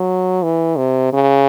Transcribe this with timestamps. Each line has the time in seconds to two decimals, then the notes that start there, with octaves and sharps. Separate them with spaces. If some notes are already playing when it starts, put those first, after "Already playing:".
Already playing: F#3
0.43 E3
0.77 C3
1.13 C#3